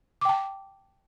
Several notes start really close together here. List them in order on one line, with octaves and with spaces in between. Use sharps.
D6 G5 A5